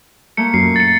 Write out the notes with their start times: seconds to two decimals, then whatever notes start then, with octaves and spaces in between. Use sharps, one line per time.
0.37 A3 A#3 C#7
0.54 F#2 A#2 C7
0.76 A6 C#7